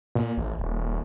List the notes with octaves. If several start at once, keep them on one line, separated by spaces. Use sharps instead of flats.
A#2
A1
D#1